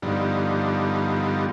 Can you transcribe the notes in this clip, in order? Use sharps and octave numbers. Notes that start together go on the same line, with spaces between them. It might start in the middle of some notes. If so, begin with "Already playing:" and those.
G2 D3 F3 G3 B3 D#4